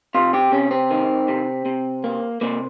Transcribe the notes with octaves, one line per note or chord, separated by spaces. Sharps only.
C3 F4
G4
C3 C#4
C4
D#3
C3
C3
A#3
C3 A#3